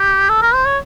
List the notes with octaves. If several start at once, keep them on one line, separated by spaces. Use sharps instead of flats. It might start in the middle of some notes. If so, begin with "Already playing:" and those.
Already playing: G4
A4
A#4
C5
C#5